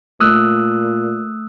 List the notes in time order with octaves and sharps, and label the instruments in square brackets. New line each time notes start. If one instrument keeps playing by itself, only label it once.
[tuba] A#2 [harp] A3 [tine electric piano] D#6 E6 F#6